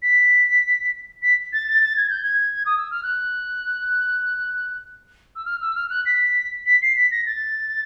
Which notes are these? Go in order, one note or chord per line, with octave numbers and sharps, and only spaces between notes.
B6
B6
A6
A6
A6
G#6
G6
G#6
D#6
E6
F6
F#6
E6
F6
E6
F6
F#6
B6
B6
C7
B6
A#6
A6